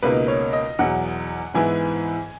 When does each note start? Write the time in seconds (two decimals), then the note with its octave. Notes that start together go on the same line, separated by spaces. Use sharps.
0.03 C#2 B2 A#3 D#4 B4
0.28 C#5
0.53 D#5
0.79 E2 B2 F#3 F#5
1.54 G#2 E3 B3 E4 G#5